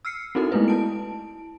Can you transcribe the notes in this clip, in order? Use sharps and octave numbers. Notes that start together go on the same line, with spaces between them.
E6 F6 C7 C#7
C4 D#4 E4 F#4 A4 A#4
G#3 A3 B3 E4 B4
E4 A5 D7